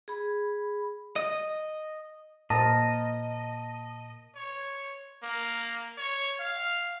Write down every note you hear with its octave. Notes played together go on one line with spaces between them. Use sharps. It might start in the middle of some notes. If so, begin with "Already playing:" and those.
G#4 B5
D#5
A#2 A#4 C5 D#5 A5
C#5
A#3
C#5
F5